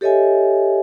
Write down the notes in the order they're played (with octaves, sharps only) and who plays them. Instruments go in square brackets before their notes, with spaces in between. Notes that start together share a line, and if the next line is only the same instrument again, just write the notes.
[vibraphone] G4 A4 C#5 D#5 E5 G#5